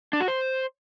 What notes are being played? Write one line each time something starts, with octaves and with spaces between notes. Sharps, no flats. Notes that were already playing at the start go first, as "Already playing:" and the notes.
D4
F#4
C5